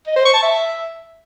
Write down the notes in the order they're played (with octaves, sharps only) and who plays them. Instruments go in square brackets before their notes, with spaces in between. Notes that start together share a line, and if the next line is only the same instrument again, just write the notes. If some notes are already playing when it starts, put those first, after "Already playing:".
[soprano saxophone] D#5
C5
C#6
A5
E5